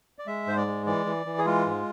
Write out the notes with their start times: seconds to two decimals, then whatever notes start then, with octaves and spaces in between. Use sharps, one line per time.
0.19 D5
0.27 G#3 E5
0.47 G#2 C5
0.57 D5
0.67 G#3
0.86 E3 D5
1.06 E3
1.26 E3
1.38 G#4
1.46 G#3 F4
1.66 G#2